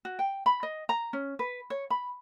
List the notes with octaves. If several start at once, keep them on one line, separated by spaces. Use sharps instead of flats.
F#4
G5
B5
D#5
A#5
C#4
B4
C#5
B5